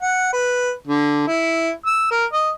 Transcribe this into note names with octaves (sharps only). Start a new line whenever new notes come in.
F#5
B4
D3
E4
E6
A#4
D#5